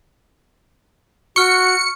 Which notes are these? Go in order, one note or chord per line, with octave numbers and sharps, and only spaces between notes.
F#4 C#6 F6 C#7